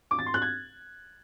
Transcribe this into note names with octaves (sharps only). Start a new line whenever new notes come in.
D6
A6
C6
F#6
G#6